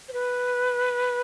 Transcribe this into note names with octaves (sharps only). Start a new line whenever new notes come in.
C5
B4